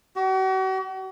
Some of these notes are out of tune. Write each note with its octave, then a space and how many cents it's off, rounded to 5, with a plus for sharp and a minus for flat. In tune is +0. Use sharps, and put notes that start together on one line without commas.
F#4 +40